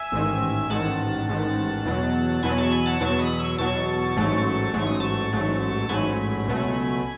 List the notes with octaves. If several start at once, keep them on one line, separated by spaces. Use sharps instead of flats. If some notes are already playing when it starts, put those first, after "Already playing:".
Already playing: E5 G#5
A1 G#2 D#3
A1 G#2 D#3 F#5 A5
A1 G#2 D#3
E2 B2 F#3
E2 B2 F#3 G#5 B5
A5 C#6
G#5 B5
F#5 A5
E2 B2 F#3 A5 C#6
B5 D#6
C#6 E6
E2 B2 F#3 A5 C#6
A1 G#2 F#3 A3
A1 G#2 F#3 A3 C#6
D#6
A5 C#6
A1 G#2 F#3 A3
A1 G#2 F#3 A3 G#5 B5
C#2 B2 F#3 A3